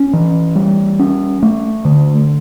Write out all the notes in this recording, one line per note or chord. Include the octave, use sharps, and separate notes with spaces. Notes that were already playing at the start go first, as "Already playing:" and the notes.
Already playing: C#4
E3
G3
C#4
A3
D3